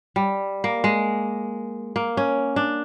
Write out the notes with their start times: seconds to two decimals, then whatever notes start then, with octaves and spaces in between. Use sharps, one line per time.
0.16 G3
0.64 A#3
0.84 G#3
1.96 A#3
2.17 C#4
2.56 D4